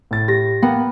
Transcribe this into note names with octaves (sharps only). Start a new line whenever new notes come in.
A2 A6
G4 A#6
A#3 B3 G5